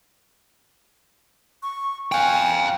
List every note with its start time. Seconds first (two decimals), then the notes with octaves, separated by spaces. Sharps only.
1.63 C#6
2.12 F5 G5 G#5